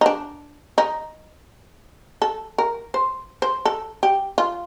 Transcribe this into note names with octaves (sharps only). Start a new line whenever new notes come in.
D#4
D4
D#4
A4
A#4
C5
C5
A4
G4
F4